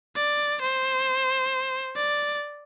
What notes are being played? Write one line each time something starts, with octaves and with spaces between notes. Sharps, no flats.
D5
C5
D5